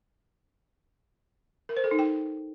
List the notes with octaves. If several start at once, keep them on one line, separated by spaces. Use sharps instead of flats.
A#4
C5
A4
D#4
G5